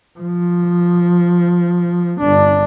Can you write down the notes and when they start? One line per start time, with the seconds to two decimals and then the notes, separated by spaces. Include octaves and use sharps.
0.20 F3
2.20 G1 D4